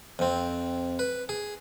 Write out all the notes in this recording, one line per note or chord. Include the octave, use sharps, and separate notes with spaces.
F2 C4
B4
G#4